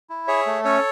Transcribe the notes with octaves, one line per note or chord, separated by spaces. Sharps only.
E4
G#4 C#5 E5
A3
C#4 A4 C#5